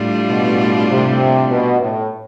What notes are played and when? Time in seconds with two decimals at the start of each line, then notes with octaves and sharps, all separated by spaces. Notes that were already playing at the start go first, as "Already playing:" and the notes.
Already playing: A2 G3 D4 F4
0.30 B2
0.90 C3
1.51 B2
1.81 A2